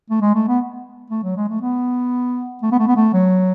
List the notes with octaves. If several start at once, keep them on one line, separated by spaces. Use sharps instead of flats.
A3
G#3
A3
B3
A3
F#3
G#3
A3
B3
A3
B3
A3
B3
A3
F#3